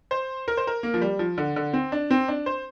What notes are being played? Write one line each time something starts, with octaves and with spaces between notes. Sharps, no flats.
C5
A#4
C5
A#4
A#3
F3
G3
F3
D3
D3
C4
D4
C4
D4
C5